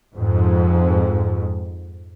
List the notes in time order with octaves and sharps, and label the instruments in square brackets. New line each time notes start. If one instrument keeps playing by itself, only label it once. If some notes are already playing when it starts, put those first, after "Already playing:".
[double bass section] F2 G#2